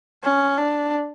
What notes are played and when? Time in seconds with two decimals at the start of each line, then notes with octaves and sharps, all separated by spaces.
0.23 C#4
0.57 D4